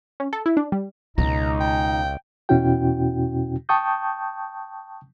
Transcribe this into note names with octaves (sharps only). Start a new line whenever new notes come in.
C#4
A4
E4
D4
G3
C#2 B2 G#3 D#4 A#5
G5
E2 B2 C#4 E4 F#4 G5
G5 A5 C#6 D#6 G6